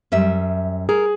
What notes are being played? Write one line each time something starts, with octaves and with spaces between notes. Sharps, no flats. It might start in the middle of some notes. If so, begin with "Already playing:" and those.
F#2 G3 E5
G#4 A#4